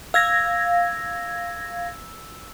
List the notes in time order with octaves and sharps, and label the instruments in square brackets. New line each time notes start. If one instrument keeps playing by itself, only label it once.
[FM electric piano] F5 G#6 A#6 [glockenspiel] E6